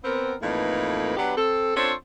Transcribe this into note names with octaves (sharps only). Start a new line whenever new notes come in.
B3 C4 A#4
F2 A2 E3 A#3 D#4 B4
F#3 B3 D4 G4 B4
C4 A4
C4 D4 F4 A4 C5 C#5